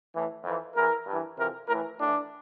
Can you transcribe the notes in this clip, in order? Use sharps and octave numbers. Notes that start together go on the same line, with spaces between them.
A2 E3
F2 E3
E2 E3 A#4
G2 E3
F2 C3 E3 A#4
A2 E3 A#4
A2 E3 D4